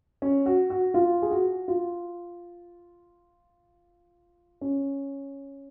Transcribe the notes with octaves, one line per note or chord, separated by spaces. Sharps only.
C#4
F#4
F#4
F4
G#4
F#4
F4
C#4